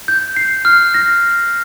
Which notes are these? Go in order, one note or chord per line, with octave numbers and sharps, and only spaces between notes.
G6
C7
F6
A#6